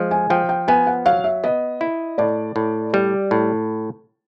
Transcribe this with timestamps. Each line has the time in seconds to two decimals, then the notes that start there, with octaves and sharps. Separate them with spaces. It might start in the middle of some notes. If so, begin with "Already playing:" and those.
Already playing: F3 G#3
0.11 G#5
0.30 F3 G5
0.49 G5
0.68 B3 G#5
0.87 F#5
1.06 F#3 F5
1.24 E5
1.44 B3 D#5
1.81 E4
2.18 A2 D5
2.56 A2
2.93 G3 D5
3.31 A2